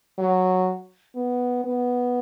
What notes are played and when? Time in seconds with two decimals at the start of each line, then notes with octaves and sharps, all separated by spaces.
0.18 F#3
1.16 B3
1.64 B3